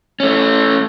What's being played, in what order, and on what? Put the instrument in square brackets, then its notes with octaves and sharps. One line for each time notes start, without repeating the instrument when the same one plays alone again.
[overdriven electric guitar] A3 C#4